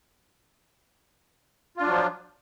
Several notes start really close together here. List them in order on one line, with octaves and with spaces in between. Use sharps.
F4 D4 F#3 F3